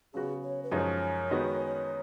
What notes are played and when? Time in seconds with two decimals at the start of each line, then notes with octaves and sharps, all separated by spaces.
0.14 C#3 F#3 B3 F#4 G#4
0.43 C#5
0.63 B4
0.71 F#2 F3 G#3 D#4 C#5
1.30 D#3 G#3 B3 D#4 F#4